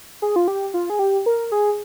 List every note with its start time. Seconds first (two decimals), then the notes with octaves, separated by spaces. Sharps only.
0.22 G#4
0.36 F4
0.48 G4
0.74 F4
0.90 G#4
0.99 G4
1.26 A#4
1.52 G#4